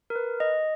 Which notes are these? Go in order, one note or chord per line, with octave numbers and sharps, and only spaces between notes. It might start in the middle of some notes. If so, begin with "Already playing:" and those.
A#4
B4
D#5